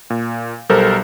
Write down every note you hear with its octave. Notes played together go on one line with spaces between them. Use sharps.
A#2
B1 G3 A4 A#4 C5